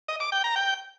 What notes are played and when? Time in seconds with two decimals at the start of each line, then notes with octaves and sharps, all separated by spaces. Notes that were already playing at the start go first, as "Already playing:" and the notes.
0.08 D#5
0.20 D6
0.32 G5
0.44 A#5
0.56 G5